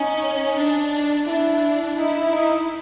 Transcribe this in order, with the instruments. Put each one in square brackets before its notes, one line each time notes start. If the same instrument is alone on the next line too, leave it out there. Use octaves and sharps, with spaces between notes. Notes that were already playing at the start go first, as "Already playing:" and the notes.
Already playing: [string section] C#4 [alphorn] D#4
[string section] D4
[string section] D4 [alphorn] E4
[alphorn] D#4 [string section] E4
[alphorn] D#4